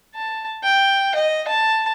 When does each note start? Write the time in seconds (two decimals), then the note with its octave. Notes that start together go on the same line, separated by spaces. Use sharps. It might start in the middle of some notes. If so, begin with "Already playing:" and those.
0.15 A5
0.63 G5
1.15 D#5
1.48 A5